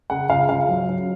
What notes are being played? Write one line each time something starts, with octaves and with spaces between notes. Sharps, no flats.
C#3 F#5
C#2 F5
C#2 F5
F#3
F#3